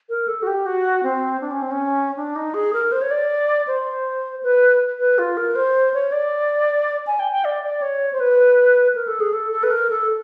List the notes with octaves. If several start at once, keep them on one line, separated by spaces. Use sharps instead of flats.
A#4
A4
F#4
G4
F#4
C4
D4
C#4
C4
C#4
D4
D#4
G#4
A#4
C5
C#5
D5
C5
B4
B4
F4
A#4
C5
C#5
D5
G#5
G5
G5
D5
D5
C#5
C5
B4
A#4
A4
G#4
A4
A4
B4
A#4
A4